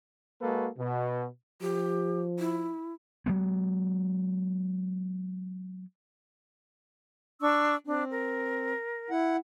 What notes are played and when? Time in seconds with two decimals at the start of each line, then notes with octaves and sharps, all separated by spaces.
0.42 G#3 A#3 F#4 A4 B4
0.78 B2
1.62 F3 G4
2.39 E4
3.26 F#3 G#3 B3
7.41 D4 C#6 E6
7.87 C4 D4
8.11 A#4
9.10 E4 F#5